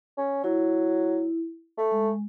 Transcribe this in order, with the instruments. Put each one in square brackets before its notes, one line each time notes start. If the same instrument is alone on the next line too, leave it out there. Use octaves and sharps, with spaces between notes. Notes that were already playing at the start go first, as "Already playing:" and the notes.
[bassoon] C#4
[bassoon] F#3 [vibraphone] E4
[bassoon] A3
[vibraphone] G#3